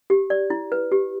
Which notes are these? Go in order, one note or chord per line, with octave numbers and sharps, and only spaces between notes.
G4
D5
E4
B4
G4